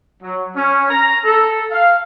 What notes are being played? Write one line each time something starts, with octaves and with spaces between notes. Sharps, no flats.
F#3
C#4
A#5
A4
F5